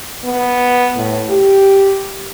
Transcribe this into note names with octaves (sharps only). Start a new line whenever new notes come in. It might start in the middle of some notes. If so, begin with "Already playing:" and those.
B3
A2
G4